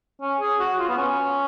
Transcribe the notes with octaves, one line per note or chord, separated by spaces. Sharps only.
C#4
G#4
F#4
F4
B3
C#4